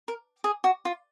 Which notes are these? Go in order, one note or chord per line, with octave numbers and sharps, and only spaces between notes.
A#4
G#4
F#4
F4